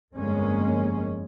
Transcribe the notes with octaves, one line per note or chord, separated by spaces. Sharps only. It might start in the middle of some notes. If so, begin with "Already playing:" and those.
G1 F2 G#3 A#3 C#4